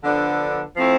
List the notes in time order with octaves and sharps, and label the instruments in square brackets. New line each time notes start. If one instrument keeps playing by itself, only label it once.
[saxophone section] D3 F3 B3 D4 A4
F3 A3 C4 E4